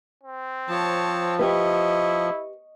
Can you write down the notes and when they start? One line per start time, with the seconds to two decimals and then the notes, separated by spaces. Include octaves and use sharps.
0.23 C4
0.69 F3 C#5 A5
1.39 E4 G4 B4 D#5 C#6